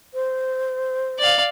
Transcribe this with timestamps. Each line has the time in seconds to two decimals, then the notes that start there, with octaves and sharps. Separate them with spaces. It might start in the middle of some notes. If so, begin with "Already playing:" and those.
0.14 C5
1.19 D5 F5